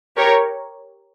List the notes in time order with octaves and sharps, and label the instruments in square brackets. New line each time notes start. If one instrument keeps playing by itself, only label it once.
[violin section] G4 A#4 C#5